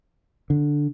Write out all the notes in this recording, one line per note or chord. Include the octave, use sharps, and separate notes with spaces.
D3